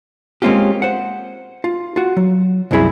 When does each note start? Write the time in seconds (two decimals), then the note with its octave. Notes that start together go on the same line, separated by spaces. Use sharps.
0.42 G#3 A#3 C4 C#4 F4 G4
0.82 C5 F#5
1.64 F4
1.96 F4 F#4
2.17 F#3
2.71 C2 F#2 C4 E4 G#4 B5